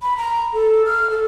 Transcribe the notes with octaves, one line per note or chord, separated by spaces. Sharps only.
B5
A#5
A4
F6
A4